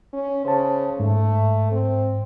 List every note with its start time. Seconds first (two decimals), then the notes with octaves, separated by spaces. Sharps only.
0.13 C#4
0.45 C#3 C5 A5
1.00 G#2 A3
1.72 C4